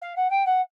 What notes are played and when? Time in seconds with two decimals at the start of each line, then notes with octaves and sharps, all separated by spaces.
0.01 F5
0.16 F#5
0.30 G5
0.46 F#5